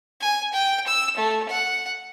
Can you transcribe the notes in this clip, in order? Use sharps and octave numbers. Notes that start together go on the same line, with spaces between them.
G#5
G5
E6
A3
F#5